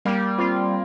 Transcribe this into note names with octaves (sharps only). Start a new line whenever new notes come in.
G3 A#3
C4 F4